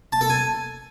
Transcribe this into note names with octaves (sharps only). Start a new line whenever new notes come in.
A5
A4
G#5